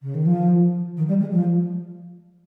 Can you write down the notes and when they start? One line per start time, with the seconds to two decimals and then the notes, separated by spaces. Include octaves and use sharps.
0.02 C#3
0.14 D#3
0.25 F3
0.97 D#3
1.08 G3
1.20 G#3
1.32 F3